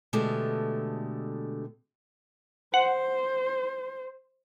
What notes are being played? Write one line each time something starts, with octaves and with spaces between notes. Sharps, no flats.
B2 D3 G#3 A3 G4
C5 F#5